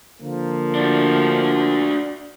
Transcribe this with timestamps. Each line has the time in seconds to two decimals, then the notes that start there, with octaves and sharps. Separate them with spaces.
0.22 D3 F3 A#3
0.75 D4 F#4